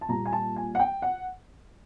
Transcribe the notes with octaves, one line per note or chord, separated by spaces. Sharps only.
A5
A#2 G3 A#5
G#5
A5
G#5
F#5
G5
F#5